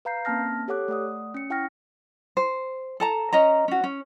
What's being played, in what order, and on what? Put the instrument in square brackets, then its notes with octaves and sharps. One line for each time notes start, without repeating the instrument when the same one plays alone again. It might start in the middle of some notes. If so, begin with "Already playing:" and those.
[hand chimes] B4 F5 A#5 G6 C7
A#3 C4 C#4 A5 F6 A#6
G4 A4 C#5 F#5 D6 F#6
A3 D5 F#5 D#6
C#4 C#7
E4 F#5 G5 C#6 F6 A#6
[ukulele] C5
A4 A5 A#5
C#4 D#5 A#5
C#4 F#4
C#4